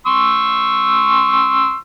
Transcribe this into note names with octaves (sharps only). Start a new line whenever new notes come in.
C6 C#6 E6